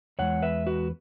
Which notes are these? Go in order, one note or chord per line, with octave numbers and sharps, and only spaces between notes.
E2 E3 G#3 C#5 F#5
B4 E5
F#4 B4